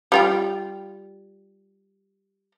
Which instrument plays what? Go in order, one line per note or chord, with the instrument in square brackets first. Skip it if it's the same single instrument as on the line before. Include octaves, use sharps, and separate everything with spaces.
[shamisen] G3 F4 G5